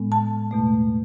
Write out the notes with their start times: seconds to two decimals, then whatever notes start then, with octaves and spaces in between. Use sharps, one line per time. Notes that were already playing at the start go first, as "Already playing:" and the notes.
Already playing: A2 G#3 B3
0.12 A5
0.51 E2 B2 A3